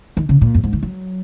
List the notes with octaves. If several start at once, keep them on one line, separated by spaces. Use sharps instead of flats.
D#3
C#3
A#2
F#2
G#2
D#3
F#3